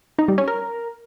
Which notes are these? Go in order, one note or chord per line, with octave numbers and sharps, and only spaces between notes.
D#4
G3
C#4
A#4